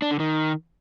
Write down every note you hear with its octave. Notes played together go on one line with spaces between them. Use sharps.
D4
D3
D#3